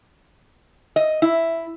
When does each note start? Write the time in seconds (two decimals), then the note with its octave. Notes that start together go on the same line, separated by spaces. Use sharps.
0.96 D#5
1.22 E4